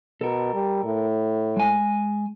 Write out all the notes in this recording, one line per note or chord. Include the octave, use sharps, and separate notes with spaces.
B2 A4 A#4
G3
A2
G#3 G#5